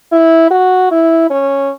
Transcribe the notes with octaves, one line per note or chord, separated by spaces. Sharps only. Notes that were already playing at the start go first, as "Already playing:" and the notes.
E4
F#4
E4
C#4